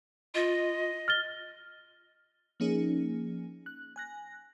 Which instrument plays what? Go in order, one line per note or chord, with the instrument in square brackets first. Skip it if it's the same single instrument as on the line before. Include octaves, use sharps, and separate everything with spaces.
[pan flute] F4 [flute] D#5
[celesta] F6 A6 G7
[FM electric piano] F3 A#3 C#4 D#4 G#4
F#6
G#5 F#6 A#6